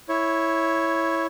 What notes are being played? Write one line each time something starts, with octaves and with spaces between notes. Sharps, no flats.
E4 C#5